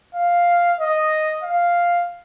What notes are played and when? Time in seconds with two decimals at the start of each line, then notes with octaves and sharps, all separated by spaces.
0.15 F5
0.79 D#5
1.44 F5